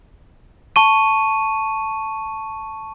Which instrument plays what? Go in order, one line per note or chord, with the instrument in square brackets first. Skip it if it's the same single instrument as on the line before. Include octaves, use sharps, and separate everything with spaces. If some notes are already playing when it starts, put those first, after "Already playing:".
[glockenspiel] A5 C#6 D#7